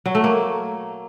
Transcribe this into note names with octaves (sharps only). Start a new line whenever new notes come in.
F#3
A3
A#3